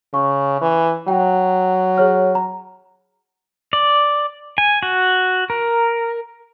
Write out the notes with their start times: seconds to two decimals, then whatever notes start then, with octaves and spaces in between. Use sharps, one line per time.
0.14 C#3 C#6
0.61 E3
1.08 F#3 G5
1.98 G#4 C#5 F6
2.35 A#5
3.73 D5
4.58 G#5
4.83 F#4
5.50 A#4